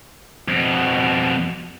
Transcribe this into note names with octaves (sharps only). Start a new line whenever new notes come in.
F2 B2